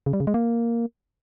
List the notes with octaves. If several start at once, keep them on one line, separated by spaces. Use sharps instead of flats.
C#3
G3
C#3
G#3
A#3